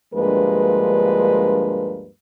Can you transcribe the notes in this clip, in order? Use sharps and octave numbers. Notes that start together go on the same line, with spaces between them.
D2 G2 F3 G#3 A#3 B4